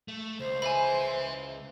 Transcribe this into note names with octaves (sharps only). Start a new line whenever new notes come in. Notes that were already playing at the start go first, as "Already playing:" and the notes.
A3
C#2 C5
B4 E5 G#5 B5